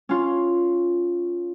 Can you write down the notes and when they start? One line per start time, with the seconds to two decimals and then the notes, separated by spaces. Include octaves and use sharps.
0.09 C#4 F4